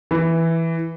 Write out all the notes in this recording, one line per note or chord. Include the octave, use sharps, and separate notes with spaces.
E3